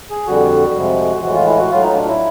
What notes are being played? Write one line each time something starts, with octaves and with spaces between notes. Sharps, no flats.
G#4
F2 D3 G3 F#4
F2 C3 F3 G#3
A2 E3 G#3 F#4
F4
E4
F#4
A2 F#3 F4
D#4
D4
E4